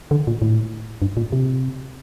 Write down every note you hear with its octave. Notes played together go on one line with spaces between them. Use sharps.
D3
A#2
A2
G2
A#2
C3